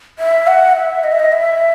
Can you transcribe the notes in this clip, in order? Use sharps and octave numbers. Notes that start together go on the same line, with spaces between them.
E5
F#5
E5
D#5
E5
D#5
E5